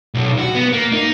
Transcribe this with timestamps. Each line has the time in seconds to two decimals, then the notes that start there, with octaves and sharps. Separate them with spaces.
0.14 B1
0.39 F#4
0.55 B3
0.72 A#3
0.92 D#4